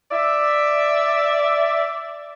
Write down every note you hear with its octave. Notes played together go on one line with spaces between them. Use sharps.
D5 E5